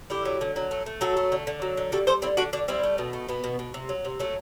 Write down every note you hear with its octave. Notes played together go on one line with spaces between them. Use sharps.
D3 E4 G4
F#3
D3
F#3
A3
A3
F#3 F#4 A4
A3
D3
D3
F#3
D3
G3 F#4 A4
G3 A4 C5
D3 C4 E4
D3 D4 F#4
D3 D4 F#4
G3 C4 E4
A3
B2
A3
B2 B3
B2
B2
C3
F#3
C3
F#3 A3